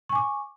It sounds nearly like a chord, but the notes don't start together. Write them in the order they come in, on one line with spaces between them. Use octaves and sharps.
C#6 G#5 D6